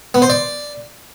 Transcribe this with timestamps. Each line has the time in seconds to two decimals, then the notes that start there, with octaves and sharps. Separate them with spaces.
0.14 B3
0.22 C5
0.30 D5